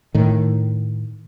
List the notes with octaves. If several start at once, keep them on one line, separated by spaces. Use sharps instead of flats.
A2 D#3